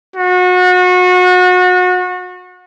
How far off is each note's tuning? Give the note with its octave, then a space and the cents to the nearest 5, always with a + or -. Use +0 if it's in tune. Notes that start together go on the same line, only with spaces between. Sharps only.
F#4 -30